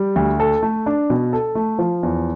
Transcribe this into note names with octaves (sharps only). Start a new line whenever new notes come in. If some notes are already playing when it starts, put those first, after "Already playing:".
Already playing: G3
D2
A4
A3
D4
B2
A4
A3
F3
E2